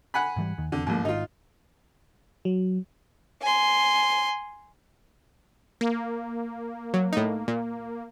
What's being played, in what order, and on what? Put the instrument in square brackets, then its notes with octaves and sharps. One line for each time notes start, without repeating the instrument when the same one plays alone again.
[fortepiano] F#5 G#5 B5
[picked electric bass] G#2 E3 G3
D#2 D#3
[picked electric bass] F1 E2 C4 [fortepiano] D3
[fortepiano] A1 D#2 [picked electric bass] G#2 F3 G#3
[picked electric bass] G#1 G#2 D#3 [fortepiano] D#4 F4
[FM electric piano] F#3
[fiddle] G#5 C6
[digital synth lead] A#3
[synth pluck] F#3
A2 D#4
A#2